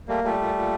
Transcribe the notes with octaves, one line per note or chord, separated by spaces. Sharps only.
G3 A3 A#3
A#2 G3 A3
A#2
A#2